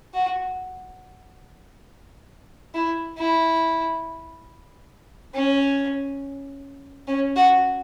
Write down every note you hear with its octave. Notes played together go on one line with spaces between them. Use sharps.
F#4
E4
E4
C#4
C#4
F#4